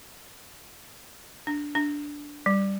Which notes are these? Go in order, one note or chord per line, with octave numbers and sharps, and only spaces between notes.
D4
D4
G3